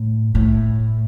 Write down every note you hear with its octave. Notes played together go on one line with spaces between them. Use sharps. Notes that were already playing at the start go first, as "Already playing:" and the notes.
Already playing: A2
A2